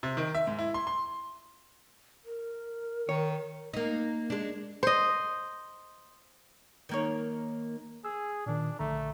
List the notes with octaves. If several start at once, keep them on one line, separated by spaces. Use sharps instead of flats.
C3
D#3
E5
G#2
E4
C6
C6
A#4
D#3 C#5
A#3 D#4
G#3 D4
C5 D#5
D#3 A#3 C#5
G#4 E6
A#2 D#3 D4
A#1 D3 A3 A#5